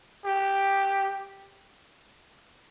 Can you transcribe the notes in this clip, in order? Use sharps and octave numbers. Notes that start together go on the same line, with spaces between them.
G4